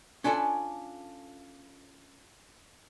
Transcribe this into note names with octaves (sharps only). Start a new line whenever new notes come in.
C#4 D4 F4 A4 G#5